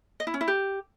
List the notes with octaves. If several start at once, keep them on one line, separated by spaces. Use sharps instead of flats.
D#5
E4
C#4
E4
G4